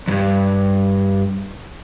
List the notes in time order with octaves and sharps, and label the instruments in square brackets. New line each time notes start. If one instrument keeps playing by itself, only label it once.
[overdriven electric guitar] E2 G2